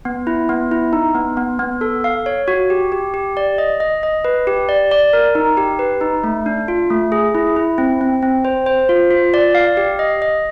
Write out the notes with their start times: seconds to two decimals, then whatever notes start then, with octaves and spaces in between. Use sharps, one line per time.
0.05 B3
0.27 E4
0.49 B3
0.71 E4
0.93 D#4
1.15 B3
1.37 B3
1.59 B3
1.81 A4
2.04 F5
2.26 C#5
2.48 F#4
2.70 G4
2.92 G4
3.14 G4
3.37 D5
3.58 D#5
3.80 D#5
4.03 D#5
4.25 B4
4.47 G4
4.69 D5
4.91 D5
5.13 A#4
5.35 D#4
5.57 G4
5.79 B4
6.01 D#4
6.24 A3
6.46 D4
6.68 F4
6.90 A3
7.12 G#4
7.35 E4
7.56 E4
7.78 C4
8.01 C4
8.22 C4
8.45 C5
8.66 C5
8.89 F4
9.11 F4
9.34 D5
9.55 F5
9.77 G4
9.99 D#5
10.22 D#5